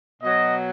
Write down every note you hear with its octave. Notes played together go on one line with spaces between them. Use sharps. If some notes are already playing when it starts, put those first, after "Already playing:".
B2 F#3 D#5